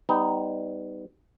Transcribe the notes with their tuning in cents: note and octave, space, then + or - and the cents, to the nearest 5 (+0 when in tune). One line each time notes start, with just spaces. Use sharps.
G3 +0 B3 +25 D#4 +0